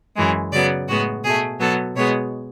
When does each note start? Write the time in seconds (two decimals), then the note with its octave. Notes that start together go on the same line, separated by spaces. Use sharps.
0.16 F#2 E3 G#3
0.53 C#3 F#3 B3 D5
0.88 A2 G#3 B3 F#4
1.24 B2 A3 G#4
1.60 B2 F#3 B3 A4
1.96 B2 G#3 B3 C#5